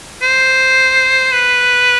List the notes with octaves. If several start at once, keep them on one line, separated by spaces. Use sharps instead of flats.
C5
B4